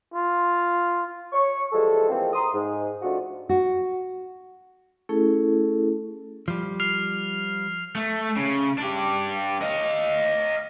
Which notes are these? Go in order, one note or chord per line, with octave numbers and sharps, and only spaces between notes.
F4
C#5 C#6
E3 F3 G3 G#3 A4
E3 F3 G#3 A#3 C4
A#5 C6 D#6
G#2
F3 A3 D4 D#4 F4 F#4
F#4
A3 C#4 E4 G#4 A4
F3 G3
F6 C7 F7
A3
C#3
D4 G4
D#5 F5